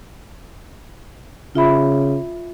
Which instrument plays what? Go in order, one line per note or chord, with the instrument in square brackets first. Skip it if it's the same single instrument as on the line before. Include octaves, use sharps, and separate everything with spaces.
[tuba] C#3 [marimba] F4 E5 B5